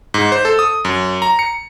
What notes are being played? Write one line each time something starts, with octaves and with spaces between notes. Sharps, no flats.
G#2
C5
A4
D#6
F#2
A#5
C#7